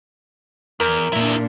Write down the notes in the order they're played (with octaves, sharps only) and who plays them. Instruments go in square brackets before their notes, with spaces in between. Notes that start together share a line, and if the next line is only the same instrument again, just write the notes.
[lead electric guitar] E2 [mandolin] A#4
[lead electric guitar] E2 E4 [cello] A#2 D4